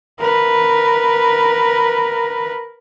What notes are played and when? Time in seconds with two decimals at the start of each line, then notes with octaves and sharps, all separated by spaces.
0.20 A#4 B4